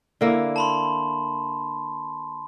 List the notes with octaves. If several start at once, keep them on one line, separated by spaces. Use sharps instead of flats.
D3 A#3 E4
A5 B5 C6